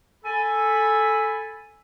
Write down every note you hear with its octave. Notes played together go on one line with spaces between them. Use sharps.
A4 G#5 B5